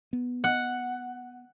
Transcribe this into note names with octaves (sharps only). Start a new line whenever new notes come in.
B3
F#5